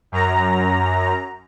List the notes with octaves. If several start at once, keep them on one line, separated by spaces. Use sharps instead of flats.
F#2 A#5